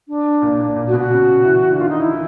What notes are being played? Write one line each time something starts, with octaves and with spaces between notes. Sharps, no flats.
D4
A#2
A#2
A#2
F#4
B2
F#4
C#3
E3
D3
D#3 F4
D#4
E4
E3